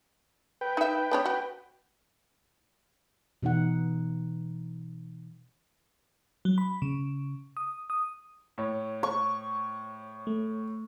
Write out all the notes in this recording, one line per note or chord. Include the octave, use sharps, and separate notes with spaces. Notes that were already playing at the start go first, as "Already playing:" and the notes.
B4 G5
D#4 E5
B3 D4 C#5
F#4
B2 E3 D#4 F#5
F#3
B5
C#3
D#6
D#6
A2 C#5
C#6
A3